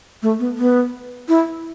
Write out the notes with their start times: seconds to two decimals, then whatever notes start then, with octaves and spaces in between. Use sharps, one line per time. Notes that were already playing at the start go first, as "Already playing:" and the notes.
0.22 A3
0.39 B3
0.58 B3
1.28 E4